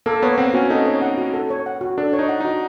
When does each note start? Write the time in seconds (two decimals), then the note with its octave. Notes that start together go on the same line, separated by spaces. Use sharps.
0.06 A#3 A4
0.22 B3 C#5
0.38 C4 F#5
0.54 C#4 F#4
0.70 D#4 A4
0.86 C#5
1.02 F#5
1.18 F#4
1.34 A4
1.50 C#5
1.66 F#5
1.81 F#4
1.98 D4 A4
2.13 C#5
2.19 D#4
2.29 F#5
2.40 D#4 F#4